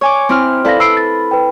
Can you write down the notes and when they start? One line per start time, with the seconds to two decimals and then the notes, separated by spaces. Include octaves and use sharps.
0.01 C#5 G#5 D6
0.29 C4 E4 F6
0.65 E4 A4 B4 D5 F5 A#6
0.80 B5 E6 C7 D7
0.97 A6
1.31 B4 G5